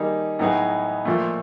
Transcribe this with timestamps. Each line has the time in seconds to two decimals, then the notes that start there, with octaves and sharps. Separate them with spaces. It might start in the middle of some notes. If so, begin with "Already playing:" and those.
Already playing: D#3 G3 A#3 D#4 G#4
0.39 A2 F#3 B3 D#4 G#4
1.05 A#2 F3 A3